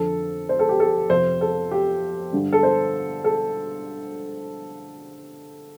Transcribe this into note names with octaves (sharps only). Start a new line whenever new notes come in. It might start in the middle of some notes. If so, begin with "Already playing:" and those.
Already playing: F2 D3 A4
C5
A4
G4
A4
F2 C3 C5
A4
G4
G2 D3
A4
C5
A4